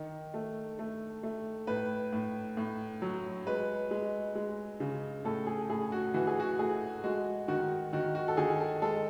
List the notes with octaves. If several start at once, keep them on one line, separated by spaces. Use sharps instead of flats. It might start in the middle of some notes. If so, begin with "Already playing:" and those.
Already playing: D#3
A3
A3
A3
A2 B4
A2
A2
F#3
G#3 B4
G#3
G#3
C#3
A2 A4
G#4
A2 G#4
F#4
E3 F#4
G#4
F#4
A3 G#4
G#3 F#4
D#3 F#4
D#3 F#4
F#4
A4
D#3 G#4
A4
G#3 A4